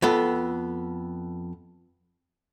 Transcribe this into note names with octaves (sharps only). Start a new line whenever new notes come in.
F2 B3 A4